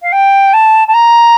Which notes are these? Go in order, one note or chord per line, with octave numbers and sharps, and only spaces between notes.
F5
G5
A5
A5
A#5